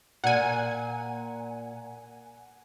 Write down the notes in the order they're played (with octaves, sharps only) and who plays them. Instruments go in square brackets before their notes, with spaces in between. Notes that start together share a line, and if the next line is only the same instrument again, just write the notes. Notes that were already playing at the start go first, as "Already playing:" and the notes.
[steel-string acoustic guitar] A#2 [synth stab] F#5 G#5